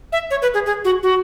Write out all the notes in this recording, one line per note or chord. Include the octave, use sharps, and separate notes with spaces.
E5
C#5
B4
G#4
G#4
F#4
F#4